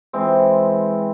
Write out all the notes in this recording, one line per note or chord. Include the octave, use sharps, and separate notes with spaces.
E3 G#3 C4